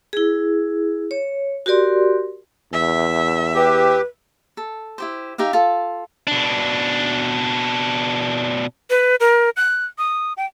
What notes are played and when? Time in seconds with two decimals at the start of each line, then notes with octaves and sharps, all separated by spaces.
0.13 E4 G#4
1.11 C#5
1.66 F#4 G4 A#4 D5 C6
2.73 E2 E5
3.55 G4 B4
4.57 A4
4.98 E4 G4 C5
5.38 D#4 G4 E5 F5
5.53 F4 A4
6.27 B2 D4
8.90 B4
9.20 A#4
9.57 F#6
9.98 D#6
10.37 G5